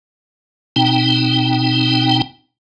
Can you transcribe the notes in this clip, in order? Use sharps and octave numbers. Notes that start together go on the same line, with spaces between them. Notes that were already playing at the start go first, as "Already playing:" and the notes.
B2 C4 D#4 G5